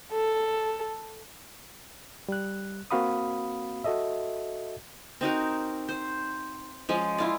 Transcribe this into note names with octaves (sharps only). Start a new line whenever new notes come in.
A4
G3 F#6
A#3 C4 F#4 F5 B5 D#6
F#4 A4 D#5 E5
C4 D#4 F#4 A#4
C5
F3 G#3 C#4
E4 F4 D5